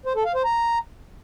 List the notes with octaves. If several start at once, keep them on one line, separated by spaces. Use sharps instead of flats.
C5
A4
F5
C5
A#5